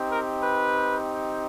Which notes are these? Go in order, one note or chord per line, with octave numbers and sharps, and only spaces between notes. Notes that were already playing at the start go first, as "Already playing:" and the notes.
Already playing: C4 D#4 G4
A#4
B4